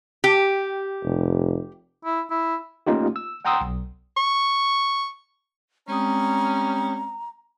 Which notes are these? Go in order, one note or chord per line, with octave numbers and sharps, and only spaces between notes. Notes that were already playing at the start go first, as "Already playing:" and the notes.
G4
F1
E4
E4
A3 A#3 C#4 D#4 F4 G4
E6
F#5 G5 A#5 C6 D#6 E6
B1
C#6
G3 G#3 C4 C#4 A#5 D#6